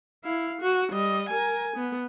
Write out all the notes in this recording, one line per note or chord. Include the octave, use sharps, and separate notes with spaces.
E4 F5
F#4
G3 D#5
A#4 G#5
B3